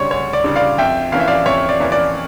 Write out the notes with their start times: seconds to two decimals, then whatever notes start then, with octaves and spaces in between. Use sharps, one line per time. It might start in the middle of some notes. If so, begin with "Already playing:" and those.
Already playing: D2 C#3 G3 D4 C#5
0.11 D2 C#5
0.33 D5
0.44 C#3 G3 D4
0.56 D5 F5
0.78 F2 E5 G5
1.12 E3 A#3 C#4 F5
1.20 E5
1.27 D5 F5
1.46 F2 C#5 E5
1.69 D5
1.80 E3 A#3 C#4
1.92 D5